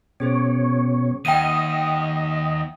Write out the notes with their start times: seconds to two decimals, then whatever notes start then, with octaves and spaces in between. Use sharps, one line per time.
0.20 B2 C#4 G#4 C5 C#5
1.25 D#2 D#5 E5 F#5 G5 D#6 D#7